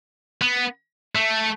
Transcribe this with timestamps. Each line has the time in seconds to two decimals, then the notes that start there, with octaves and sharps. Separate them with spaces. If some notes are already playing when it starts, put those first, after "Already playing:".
0.42 B3
1.15 A3